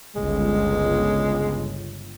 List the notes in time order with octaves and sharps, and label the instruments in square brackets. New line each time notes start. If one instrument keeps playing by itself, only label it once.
[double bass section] G1 C#2 [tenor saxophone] G#3